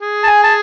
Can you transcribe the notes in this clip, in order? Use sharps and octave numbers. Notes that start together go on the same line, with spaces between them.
G#4
A5
G#5
A5